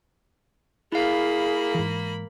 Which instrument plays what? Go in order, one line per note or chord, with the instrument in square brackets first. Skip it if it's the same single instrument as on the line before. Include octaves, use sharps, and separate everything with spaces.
[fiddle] A#3 B5 [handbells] E4 F5 [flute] G#4
[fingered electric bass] G#2 E3